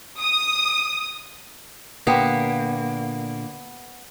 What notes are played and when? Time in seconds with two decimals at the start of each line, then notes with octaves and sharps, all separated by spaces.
0.19 D#6
2.07 A#2 D3 A#3 B3 G4